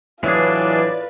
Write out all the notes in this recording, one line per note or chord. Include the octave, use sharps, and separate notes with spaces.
A2 E3 F#3 D4 F4 G#4 B4 D5